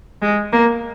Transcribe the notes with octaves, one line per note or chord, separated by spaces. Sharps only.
G#3
A#3